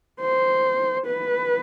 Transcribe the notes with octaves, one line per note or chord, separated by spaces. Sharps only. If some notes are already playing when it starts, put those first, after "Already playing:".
C5
B4